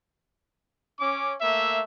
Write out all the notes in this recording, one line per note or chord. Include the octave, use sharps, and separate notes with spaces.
C#4 D6
A3 A#3 E5